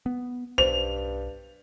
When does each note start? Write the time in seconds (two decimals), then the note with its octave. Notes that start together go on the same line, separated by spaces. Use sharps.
0.06 B3
0.58 B1 G2 C5 F7